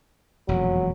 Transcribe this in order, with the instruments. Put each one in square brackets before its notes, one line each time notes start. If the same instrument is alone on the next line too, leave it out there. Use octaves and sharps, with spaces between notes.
[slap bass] E1 F2 A#2 [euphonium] F#3